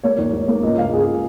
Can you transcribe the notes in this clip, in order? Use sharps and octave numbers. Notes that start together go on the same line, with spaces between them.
A#3 C#5
D#2 C#5
D#2
A#3
C#2 D#5
C#2 F5
C#2 G#4